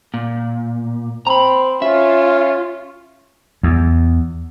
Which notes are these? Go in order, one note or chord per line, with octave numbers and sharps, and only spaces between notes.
A#2
C4 A#5 B5
C#4 F4 E5
E2